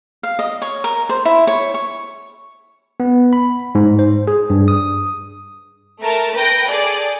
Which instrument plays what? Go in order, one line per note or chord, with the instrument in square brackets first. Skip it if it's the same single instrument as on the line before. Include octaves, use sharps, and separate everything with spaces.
[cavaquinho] F5
D#5
C#5
A#4
C5
E4
C#5
C#6
[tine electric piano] B3
B5
G#2
C5
G#4
G2
D#6
[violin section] A3 A#4 A5
B4 G5 A#6
G#4 A4 D5